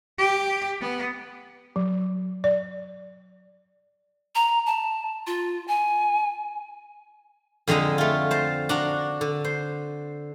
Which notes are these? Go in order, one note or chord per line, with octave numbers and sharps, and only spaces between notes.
G4
B3
F#3
D5
A#5
A5
F4
G#5
F2 D3 G#3 D#5 A#5
A3 F4
C5 A5 A#5
D4 F#4 A#5
D3
C5